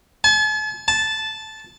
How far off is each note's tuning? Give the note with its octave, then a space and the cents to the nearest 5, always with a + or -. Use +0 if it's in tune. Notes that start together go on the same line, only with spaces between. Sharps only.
A5 -45
A5 -10